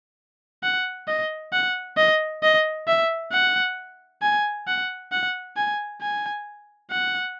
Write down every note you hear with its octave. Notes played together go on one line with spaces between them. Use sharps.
F#5
D#5
F#5
D#5
D#5
E5
F#5
G#5
F#5
F#5
G#5
G#5
F#5